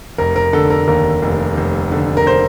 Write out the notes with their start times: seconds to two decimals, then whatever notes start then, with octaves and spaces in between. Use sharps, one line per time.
0.18 F1 A#4
0.36 A#4
0.53 D3 A4
0.70 A#4
0.87 D#2 A#4
1.22 F1
1.57 F1
1.92 D3
2.17 A#4
2.27 C5